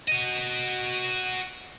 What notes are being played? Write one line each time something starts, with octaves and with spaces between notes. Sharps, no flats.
F#4 D#5